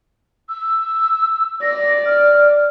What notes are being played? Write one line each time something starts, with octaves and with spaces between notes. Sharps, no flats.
E6
D5 A#6
F6